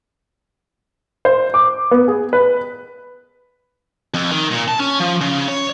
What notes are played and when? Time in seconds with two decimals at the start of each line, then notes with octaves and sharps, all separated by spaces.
1.25 C5
1.54 D6
1.91 B3
2.08 G#4
2.33 B4
4.14 F2
4.31 D#3
4.52 A#2
4.69 A5
4.80 C#4
5.00 F3
5.21 C#3
5.48 C#5